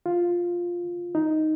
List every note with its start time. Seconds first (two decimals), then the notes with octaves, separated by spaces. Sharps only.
0.06 F4
1.15 D#4